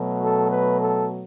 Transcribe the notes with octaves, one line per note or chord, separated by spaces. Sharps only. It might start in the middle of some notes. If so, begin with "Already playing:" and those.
Already playing: B2 F#3 A3
A4
B4
A4